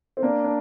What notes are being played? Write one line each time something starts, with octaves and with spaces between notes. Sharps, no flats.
C4
A#3 D4
D4